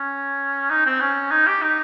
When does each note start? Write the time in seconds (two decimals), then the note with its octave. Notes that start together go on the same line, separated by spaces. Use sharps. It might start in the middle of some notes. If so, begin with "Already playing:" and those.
Already playing: C#4
0.70 D#4
0.86 C4
1.00 C#4
1.31 D#4
1.47 G4
1.62 D#4